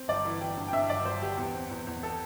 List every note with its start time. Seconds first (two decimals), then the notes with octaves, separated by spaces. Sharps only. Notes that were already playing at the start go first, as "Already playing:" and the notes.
Already playing: C4
0.08 G1 D5
0.25 E3
0.41 E3 G5
0.57 G2
0.68 G5
0.73 G2 E5
0.89 G1 D5
1.05 G1 C5
1.22 G1 G4
1.37 E2
1.54 C4
1.71 E2
1.87 E2
2.03 A4